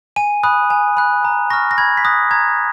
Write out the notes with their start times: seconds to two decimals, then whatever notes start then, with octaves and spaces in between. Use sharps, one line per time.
0.16 G#5 D#7
0.43 B5 D#6 F#6
0.70 G#5
0.97 B5 F#6
1.25 A#5
1.50 C#6 F6 A#6
1.71 A#6
1.78 B5 G#6
1.97 B6
2.05 D#6 F#6 A#6
2.31 A#5 G#6